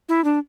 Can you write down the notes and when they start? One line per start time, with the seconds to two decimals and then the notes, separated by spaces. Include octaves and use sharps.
0.09 E4
0.24 D4